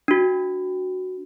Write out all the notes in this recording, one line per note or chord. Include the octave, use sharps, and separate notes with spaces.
D4 F#4